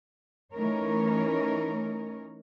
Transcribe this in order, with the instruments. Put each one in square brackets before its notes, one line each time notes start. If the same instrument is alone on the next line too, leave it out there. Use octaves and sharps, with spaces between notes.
[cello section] E3 A3 C#4 D#4 A#4 C#5